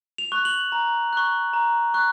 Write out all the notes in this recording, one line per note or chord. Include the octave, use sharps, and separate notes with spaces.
F7
C#6 F#6
F#7
A#5
C#6 F#6
A#5
C#6 F#6